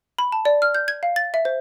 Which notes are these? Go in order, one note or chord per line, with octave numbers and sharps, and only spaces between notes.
B5
A5
D5
F6
G6
G#6
F5
A6
E5
C5